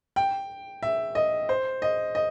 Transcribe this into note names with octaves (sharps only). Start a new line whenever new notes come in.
G5
E5
D#5
C5
D#5
D#5